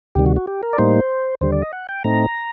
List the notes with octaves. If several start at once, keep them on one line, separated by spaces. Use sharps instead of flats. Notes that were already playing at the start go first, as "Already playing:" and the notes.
D2 C3 D#3 G3 G4
F#4
F#4
G4
A#4
D5
A2 G3 A#3 D#4 C5
D#2 D3 G3 C5
D5
D#5
F#5
G5
A2 A3 C4 D#4 A#5